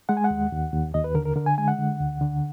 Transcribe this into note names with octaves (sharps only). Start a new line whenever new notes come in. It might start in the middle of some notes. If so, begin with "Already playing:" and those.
G#3 F#5
G#5
F#5
D#2
D#2
D#2
D#2 D#5
B4
D3 A#4
A#4
D3 A#4
G#5
G#3 G#5
F#5
D3
D2
D3